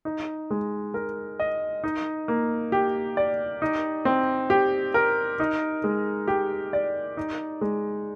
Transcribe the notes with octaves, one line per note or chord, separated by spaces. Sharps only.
D#4
G#3
A#4
D#5
D#4
A#3
G4
D5
D#4
C4
G4
A#4
D#4
G#3
G4
D5
D#4
G#3